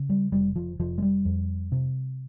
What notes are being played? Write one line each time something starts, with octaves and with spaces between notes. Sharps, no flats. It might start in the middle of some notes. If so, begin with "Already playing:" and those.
Already playing: C#3
G3
F1 G3
F3
F1 F3
G#3
G3
F2
C3